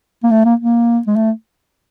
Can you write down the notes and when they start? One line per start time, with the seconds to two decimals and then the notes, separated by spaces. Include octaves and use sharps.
0.23 A#3
0.31 A3
0.45 A#3
0.59 A#3
1.07 G#3
1.16 A3